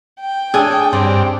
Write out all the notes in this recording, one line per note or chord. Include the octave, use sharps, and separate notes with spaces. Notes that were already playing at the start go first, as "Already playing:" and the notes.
G5
D4 G#4 A4 G#5
G2 C4 D5